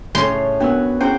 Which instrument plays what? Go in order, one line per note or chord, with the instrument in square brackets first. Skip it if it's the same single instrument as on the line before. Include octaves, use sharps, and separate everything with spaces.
[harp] A2 C#3 C#4 [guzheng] C6
[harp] B3 F#4 [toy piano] D4 A#4
[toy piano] C#4 E4 G#4 [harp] F#4 C5 G5